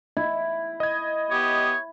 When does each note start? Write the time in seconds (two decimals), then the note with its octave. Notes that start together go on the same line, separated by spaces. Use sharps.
0.17 E4
0.80 D#5 G#6
1.31 B3 G4 C#5 D#6